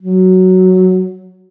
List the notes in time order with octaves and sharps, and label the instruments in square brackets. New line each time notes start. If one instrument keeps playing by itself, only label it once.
[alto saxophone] F#3